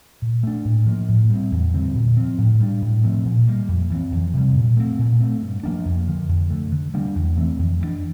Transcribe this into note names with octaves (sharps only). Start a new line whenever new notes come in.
A#2
A3 D4
A2
F3 A#3
A2
G3 C4
E2
D3 G3 C4
A#2
F3 C4
A2
G3 D4
A2
F3 A3 C4
A#2
G3 A#3
F2
E3 A3 C4
F2
C3 G3
A#2
A3 C4
A#2
A3 C4
G2
F3 A#3 D4
F2
D3 F3
F2
D3 A3
D3
G3 A#3 D4
E2
E3 A3 C4
F2
E3 A3 D4